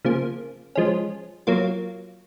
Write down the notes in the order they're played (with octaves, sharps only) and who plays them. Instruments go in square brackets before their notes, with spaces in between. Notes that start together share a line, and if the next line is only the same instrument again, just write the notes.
[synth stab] C#3 F3 A#3
F3 G#3 C#4
F#3 A#3 F4